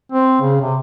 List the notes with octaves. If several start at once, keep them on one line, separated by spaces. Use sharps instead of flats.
C4
C#3
C3